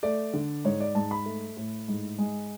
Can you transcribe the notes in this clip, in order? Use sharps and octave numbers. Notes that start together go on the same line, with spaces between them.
A3 D5
D3
G#2 C#5
D5
G#2 A5
B5
A3
A2
G#2
G#3